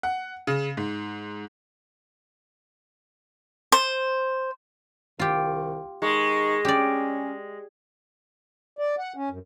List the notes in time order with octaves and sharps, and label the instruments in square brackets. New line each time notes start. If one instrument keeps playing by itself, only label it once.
[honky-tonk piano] F#5
C#3
G#2
[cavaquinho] C5
[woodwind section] C2 D#3 [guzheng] F4 G4
[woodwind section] D#3 D#4 C#6 [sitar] G#3
[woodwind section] C#4 [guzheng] G4 D5
[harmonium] D5
F#5
C#4
F#2